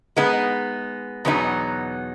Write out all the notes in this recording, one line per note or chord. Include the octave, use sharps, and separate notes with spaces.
G#3 B3 D#4
E2 B2 F#3 B3 D#4